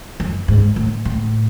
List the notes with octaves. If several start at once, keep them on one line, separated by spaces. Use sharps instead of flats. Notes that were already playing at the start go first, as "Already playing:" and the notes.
F#2
G#2
A2
A2